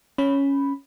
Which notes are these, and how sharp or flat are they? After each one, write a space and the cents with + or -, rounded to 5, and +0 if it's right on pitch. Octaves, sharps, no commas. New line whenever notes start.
C#4 +0 B5 +0